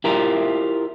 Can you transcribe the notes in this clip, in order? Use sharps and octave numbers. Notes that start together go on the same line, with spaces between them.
E4 F4 G4 A#4 C5